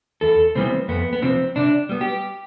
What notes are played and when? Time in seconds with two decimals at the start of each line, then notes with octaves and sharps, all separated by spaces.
0.21 E2 A4
0.55 C3 E3 G3 B3 C4
0.88 F2 B3
1.13 B3
1.22 C3 F3 C4
1.56 C3 D4
1.89 G3 B3
2.01 G4